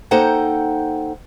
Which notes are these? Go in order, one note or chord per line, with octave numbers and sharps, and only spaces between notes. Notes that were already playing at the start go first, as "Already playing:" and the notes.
A#3 D#4 A4 C5 F#5 G5